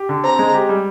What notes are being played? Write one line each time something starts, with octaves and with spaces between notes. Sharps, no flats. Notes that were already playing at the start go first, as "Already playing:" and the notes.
Already playing: G4
D3
C4 A#5
G#3
G4
G3